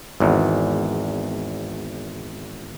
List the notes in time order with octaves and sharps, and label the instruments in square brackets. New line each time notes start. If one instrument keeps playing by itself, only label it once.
[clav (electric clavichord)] G#1 E2